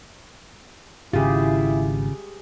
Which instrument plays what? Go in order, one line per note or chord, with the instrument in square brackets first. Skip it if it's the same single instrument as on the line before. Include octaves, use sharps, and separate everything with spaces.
[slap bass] G#1 G#2 [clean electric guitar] C#3 F4 [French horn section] E4 [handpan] G4 G#4